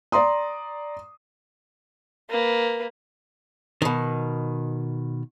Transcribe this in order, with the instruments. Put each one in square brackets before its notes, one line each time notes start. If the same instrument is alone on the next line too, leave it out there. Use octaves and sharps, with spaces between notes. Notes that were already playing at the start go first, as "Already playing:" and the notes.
[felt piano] D5 A#5 C6 D#6
[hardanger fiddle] A#3 B4
[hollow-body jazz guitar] B2 D#3